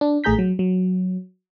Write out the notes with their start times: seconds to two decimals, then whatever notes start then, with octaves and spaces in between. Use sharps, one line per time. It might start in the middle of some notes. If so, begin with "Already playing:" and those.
0.01 D4
0.24 A1 A3 G#4 A#5 G6 B6
0.39 F#3
0.59 F#3